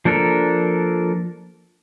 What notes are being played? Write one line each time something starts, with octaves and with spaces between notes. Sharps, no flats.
F3 A#3 D4 A4 A#4